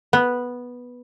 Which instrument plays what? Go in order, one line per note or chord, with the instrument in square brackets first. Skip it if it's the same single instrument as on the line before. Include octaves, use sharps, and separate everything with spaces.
[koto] B3